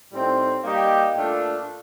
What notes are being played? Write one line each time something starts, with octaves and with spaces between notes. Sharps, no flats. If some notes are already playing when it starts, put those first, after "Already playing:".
A2 G3 C4 D#4
G3 A#3 D#4 G4
A#2 A3 D4 F4